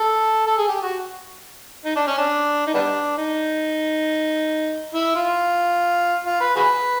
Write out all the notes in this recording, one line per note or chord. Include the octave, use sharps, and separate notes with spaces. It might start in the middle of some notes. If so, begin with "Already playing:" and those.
Already playing: A4
A4
G#4
G4
F#4
D#4
D4
C#4
D4
D#4
G3 B3 D4
D#4
E4
F4
F4
B4
F#4 G#4 B4